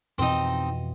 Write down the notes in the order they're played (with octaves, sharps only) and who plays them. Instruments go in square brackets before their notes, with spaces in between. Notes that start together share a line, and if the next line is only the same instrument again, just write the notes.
[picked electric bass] F2 B2 E3 [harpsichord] C4 D#4